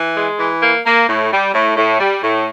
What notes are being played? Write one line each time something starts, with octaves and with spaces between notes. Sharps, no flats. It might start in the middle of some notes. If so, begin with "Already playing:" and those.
Already playing: E3
G#3
E3
A#3
A#3
A2
G3
A2
A2
G3
A2